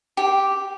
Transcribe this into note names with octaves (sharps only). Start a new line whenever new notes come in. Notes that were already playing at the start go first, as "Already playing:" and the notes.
G4